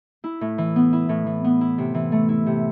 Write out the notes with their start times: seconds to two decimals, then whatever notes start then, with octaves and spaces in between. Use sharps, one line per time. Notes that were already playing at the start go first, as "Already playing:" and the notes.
0.24 E4
0.41 A2
0.58 E3
0.76 B3
0.93 E4
1.09 A2
1.26 E3
1.44 B3
1.61 E4
1.78 C3
1.94 E3
2.12 A3
2.29 E4
2.46 C3